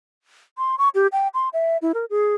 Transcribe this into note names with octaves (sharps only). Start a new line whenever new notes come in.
C6
C#6
G4
G5
C6
E5
E4
A#4
G#4